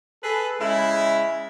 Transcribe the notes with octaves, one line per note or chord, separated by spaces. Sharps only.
G#4 A4 B4
C#3 G#3 E4